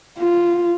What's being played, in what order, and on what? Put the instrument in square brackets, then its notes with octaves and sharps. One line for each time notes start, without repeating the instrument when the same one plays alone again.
[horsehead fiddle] F4